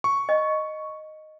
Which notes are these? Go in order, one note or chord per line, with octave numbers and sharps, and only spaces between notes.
C#6
D#5